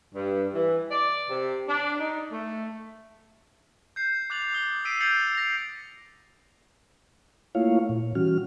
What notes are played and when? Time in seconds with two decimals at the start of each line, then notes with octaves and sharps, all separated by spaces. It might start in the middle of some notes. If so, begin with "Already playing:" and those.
0.15 G2
0.54 E3
0.91 D5
1.30 C3
1.68 D4
2.00 D#4
2.32 A3
3.96 G6 C7
4.30 D6 F#6 A6 F7 F#7
4.53 D6 D#6 G7
4.85 E6 B6 C7 D7 D#7
5.00 G6 A6 C7 C#7 F7 F#7
5.35 A#6 F7
7.55 A3 A#3 E4 F4 C#5 F5
7.89 A#2
8.15 E3 G3 C#4 F#4 F6